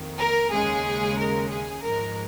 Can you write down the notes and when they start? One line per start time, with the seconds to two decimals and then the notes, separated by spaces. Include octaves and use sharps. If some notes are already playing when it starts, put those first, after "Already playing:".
Already playing: F2 D#3 A#3
0.20 A#4
0.53 D#2 C#3 G#3 G#4
1.18 A#4
1.51 G#4
1.83 G#2 F3 G#3 A#4